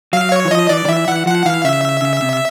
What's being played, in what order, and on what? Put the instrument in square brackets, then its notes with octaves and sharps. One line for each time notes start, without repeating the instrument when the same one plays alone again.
[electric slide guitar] F#3 [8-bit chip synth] F5
[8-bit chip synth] C#5
[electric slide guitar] E3
[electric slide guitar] F3 [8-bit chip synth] D#5
[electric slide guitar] E3 [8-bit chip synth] D5
[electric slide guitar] D#3
[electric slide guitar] E3 [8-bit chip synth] E5
[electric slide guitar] E3 [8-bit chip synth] F#5
[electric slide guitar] F3 [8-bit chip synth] F#5
[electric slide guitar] E3 [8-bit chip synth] F5
[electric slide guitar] C#3 [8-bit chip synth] E5
[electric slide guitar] C#3
C3